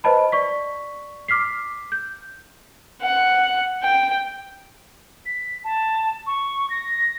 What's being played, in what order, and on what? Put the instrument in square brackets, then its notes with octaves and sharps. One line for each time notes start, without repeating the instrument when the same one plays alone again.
[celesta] B4 C5 D#5 A5 B5
D5 C#6 B6
D6 F6 B6 C7
G6
[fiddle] F#5
G5
[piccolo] B6
A5
C#6
A#6